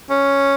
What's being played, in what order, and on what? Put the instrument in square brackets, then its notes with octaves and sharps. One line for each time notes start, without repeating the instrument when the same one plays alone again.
[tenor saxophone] C#4